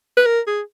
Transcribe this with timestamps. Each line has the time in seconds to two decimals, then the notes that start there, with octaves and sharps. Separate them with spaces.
0.17 B4
0.26 A#4
0.47 G#4